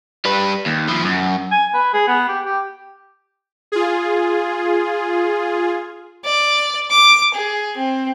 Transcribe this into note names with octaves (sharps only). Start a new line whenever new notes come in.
G3 B4
D#2
F3 E4
F#2
G#5
B4
G#4
B3
G4
G4
F4 G#4
D5
D6
G#4
C4